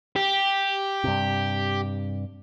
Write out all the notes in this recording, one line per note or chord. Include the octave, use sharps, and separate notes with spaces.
G4
G2 C3